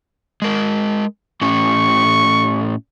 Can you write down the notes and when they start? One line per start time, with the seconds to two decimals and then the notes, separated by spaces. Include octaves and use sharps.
0.42 G#3 A#4
1.41 A2 C#4 C#6